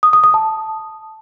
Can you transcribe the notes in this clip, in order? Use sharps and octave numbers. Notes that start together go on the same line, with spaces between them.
D#6
D#6
D#6
A5